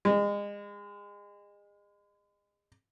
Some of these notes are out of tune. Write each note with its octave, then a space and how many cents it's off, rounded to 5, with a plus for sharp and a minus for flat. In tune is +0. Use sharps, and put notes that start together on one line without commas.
G#3 -30